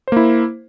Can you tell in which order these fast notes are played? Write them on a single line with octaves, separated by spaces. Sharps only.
C5 A#3 E4